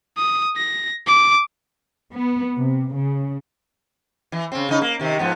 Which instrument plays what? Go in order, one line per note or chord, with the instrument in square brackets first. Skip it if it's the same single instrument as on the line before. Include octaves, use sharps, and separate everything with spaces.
[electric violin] D#6
A#6
D6
[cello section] B3
C3
C#3
[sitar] E3
C#3 C4
C#3 D#4
A#3
C3 D#3
G#2 F3 B3